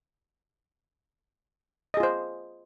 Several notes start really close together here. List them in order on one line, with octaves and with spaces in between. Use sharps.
D#5 G#4 F4 C5